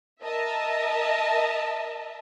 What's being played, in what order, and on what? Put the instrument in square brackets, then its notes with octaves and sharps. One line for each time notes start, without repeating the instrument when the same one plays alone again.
[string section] A#4 D#5 E5 A5